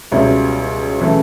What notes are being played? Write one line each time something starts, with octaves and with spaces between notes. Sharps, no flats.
C#2 B2 G3 C#4 E4
C#3 E3 A3